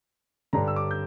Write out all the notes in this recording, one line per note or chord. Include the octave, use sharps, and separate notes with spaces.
G2 D3 G3 D4 A#5
E6
D6
G6